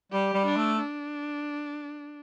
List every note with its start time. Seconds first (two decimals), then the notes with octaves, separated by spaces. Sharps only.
0.12 G3 G4
0.34 G3
0.46 D4
0.57 A3
0.79 D4